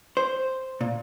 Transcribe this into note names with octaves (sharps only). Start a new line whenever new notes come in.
C5
A#2